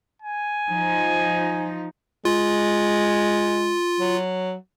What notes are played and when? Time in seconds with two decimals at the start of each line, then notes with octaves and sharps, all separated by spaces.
0.22 G#5
0.68 F3 D#4
2.25 G#3 F4
4.00 F#3